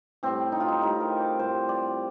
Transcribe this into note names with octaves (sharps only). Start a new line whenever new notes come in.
A2 G3 C4
D#4
F4
D#4
A2 G3 D#4
A#4
D5
A2 G3 C5
D5